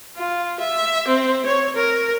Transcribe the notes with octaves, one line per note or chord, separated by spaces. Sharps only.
F4
E5
C4
C#5
A#4